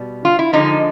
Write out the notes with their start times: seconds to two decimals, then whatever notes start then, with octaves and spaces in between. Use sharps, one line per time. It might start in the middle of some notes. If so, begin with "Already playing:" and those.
Already playing: B2 G3
0.25 F4
0.39 E4
0.53 D3 F3 G#3 D#4